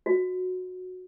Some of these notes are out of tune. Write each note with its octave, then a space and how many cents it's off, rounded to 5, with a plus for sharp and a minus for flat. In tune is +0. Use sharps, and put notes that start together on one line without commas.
F#4 -15